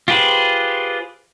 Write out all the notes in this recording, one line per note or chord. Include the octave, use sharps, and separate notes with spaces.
F4 G4 G#4 B4 C5